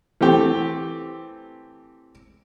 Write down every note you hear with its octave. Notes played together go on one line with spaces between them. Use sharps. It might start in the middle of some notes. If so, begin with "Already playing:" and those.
E3 A3 C4 G4